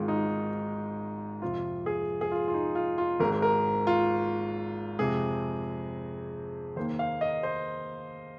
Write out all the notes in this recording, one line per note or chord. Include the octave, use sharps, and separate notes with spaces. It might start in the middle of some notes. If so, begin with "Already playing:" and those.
Already playing: G#1 G#2 D#3 G#3 F4
D#4
F2 C3 F3 F4
G#4
G#4
F4
F4
D#4
F4
F4
G#1 G#2 G#3 A#4
A#4
F4
F2 C3 G#3 G#4
D#2 D#3 A#3 C5
F5
D#5
C5